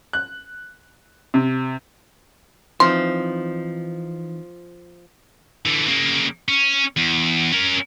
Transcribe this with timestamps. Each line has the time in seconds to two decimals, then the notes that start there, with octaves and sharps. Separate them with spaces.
0.13 F#6
1.34 C3
2.80 E3 F3 C4 D#4 C6
5.65 D3 E3
5.88 C#3 A#3
6.48 C#4
6.97 E2
7.52 C#4 A#4